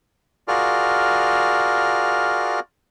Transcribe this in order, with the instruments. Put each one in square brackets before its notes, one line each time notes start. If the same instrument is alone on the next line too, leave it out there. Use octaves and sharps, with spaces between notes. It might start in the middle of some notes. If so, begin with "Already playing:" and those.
[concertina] F4 F#4 G#4 A#4 D5 F6